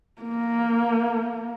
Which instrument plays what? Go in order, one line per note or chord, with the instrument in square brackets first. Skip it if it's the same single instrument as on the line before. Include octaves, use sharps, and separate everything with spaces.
[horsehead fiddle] A#3